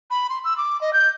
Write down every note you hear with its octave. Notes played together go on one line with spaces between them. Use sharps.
B5
C6
E6
D6
D#5
G6